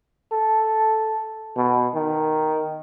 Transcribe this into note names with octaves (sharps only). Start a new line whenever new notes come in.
A4
B2
D#3